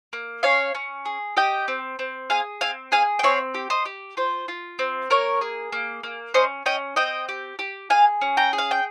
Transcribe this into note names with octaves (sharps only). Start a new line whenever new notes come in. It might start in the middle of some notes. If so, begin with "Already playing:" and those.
A#3
C#4 C#5 F5
C#4
G#4
G4 D#5 G5
C4
C4
G#4 F5 G#5
C4 F5 G#5
G#4 F5 G#5
G5
C4 C#5 F5
G4
C5 D#5
G4
F4 C5
F4
C4
A#3 A#4 C#5
G#4
A#3
A#3
C#4 C5 D#5
C#4 D#5 G5
C4 D#5 G5
G4
G4
G#4 F5 G#5
C#4
G5 A#5
G#4
F5
G5